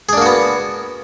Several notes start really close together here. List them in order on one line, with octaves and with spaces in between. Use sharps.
G#4 D4 A#3 F#4 B3